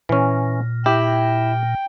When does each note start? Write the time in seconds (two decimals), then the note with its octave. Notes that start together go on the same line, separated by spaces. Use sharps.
0.09 A#2 E3 C#4
0.86 E4 G4 G5